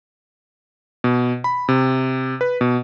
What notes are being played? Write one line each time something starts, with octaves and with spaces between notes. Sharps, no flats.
B2
B5
C3
B4
B2